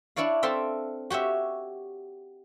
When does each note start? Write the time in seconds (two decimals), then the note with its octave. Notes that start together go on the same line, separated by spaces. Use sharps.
0.16 D4 E4 C#5 D5 F5
0.43 C4 A4 E5 F5 G5 C6
1.10 F#4 G4 C#5 E5